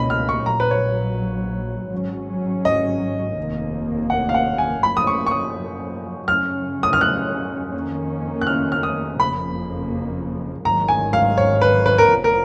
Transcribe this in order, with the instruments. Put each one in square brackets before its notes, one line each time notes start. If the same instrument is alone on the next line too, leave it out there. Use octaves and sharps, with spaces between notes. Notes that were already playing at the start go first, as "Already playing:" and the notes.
Already playing: [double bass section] C#2 B2 A#3 C#4 [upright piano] D#5 B5
[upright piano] F6
C#6
[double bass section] A#1 A#2 F#3 [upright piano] A#5
[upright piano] B4
C#5
[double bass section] G#1 G#2 F#3 C#4
[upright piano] D#5
[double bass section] F1 D#2 D#3 A#3
[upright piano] F#5
F5
F#5
G#5
[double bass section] F#2 F3 A#3 [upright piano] B5
[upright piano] D#6
C#6
C#6
D#6
[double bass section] F#2 C#3 F#3 C#4 [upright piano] F6
[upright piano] D#6
F6
F#6
[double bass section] F2 D#3 A#3 C#4
[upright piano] F#6
F6
F6
D#6
[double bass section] F#1 F2 C#3 F3 A#3 [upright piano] B5
[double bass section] G#1 G#2 D#3 F#3 [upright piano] A#5
[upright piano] G#5
F5
C#5
B4
B4
A#4
[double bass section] F1 F2 F3 B3
[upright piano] A#4